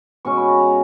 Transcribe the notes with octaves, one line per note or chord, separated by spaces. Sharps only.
B2 G#3 C#4 C#6
B5
A#5
A#5